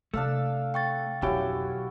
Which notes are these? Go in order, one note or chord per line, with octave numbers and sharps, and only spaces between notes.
C3 A3 D4 F5 E6
G5 C#6 A6
B1 F2 D3 C#4 E4 F#4 G4